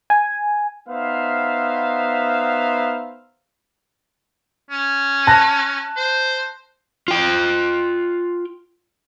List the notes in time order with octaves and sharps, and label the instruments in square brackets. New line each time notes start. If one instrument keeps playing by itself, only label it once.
[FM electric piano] G#5
[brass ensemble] B3 D#4 C5 E5 F5
[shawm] C#4
[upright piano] A5 F#6 A#6
[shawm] C5
[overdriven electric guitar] F4 G5